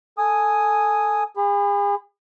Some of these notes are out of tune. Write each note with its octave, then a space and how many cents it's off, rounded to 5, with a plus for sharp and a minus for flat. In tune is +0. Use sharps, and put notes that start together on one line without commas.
A4 +0 G#5 +0 D#6 +0
G#4 -40 B5 +20